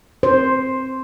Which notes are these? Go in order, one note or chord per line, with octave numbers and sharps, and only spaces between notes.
C5